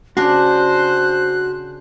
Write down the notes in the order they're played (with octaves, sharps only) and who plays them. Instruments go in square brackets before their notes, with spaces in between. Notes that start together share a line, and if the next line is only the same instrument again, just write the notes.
[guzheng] C#3 D4 C6 [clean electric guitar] F#4 [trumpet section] C5 [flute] F#6